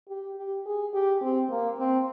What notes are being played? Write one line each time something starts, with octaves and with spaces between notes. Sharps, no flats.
G4
G4
G#4
G4
C4
A#3
C4